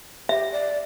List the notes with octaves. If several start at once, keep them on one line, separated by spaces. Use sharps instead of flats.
G4 E5
D5